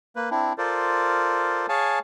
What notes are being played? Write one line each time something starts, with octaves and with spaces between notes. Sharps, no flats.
A#3 B4
C4 D4 E4
F4 A4 A#4 C5 D5
G#4 C#5 F5 G#5 A5